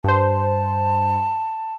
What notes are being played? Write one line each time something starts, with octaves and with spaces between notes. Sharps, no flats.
G2 C5 A5